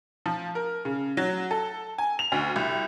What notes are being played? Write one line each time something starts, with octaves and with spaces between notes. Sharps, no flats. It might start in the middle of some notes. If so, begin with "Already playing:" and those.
F3
A#4
C#3
F#3
A4
G#5
F7
D2
C2